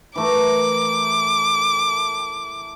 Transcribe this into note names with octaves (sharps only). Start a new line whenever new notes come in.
E3 A3 A#4 D6